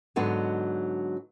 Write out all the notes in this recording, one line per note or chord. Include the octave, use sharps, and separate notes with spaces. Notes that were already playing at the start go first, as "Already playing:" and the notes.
G#2 D3 F#3 B3 D4 D#4